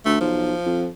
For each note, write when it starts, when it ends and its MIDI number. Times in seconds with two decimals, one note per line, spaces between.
0.05 0.16 38
0.05 0.19 57
0.20 0.53 35
0.20 0.88 53
0.66 0.88 41